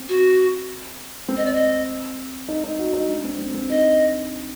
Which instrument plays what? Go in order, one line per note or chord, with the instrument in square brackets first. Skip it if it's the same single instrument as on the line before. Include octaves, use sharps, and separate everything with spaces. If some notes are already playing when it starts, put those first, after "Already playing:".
Already playing: [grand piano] C4
[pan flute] F#4
[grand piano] C4
[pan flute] D#5
D5
D#5
[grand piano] D#4
D#4
F#4
D#4
D4
C4
C4
C4
[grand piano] D#4 [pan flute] D#5